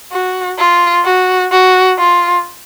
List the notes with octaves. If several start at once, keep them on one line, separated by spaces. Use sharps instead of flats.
F#4
F4
F#4
F#4
F4